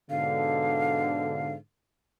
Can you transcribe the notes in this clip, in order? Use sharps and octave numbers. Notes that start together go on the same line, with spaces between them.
G#2 B2 D3 F5